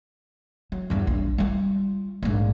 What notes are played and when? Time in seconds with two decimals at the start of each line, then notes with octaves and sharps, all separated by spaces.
0.72 F#3
0.90 E2 G2
1.07 A#1 E3
1.38 G3 F4
2.23 A#1 G#2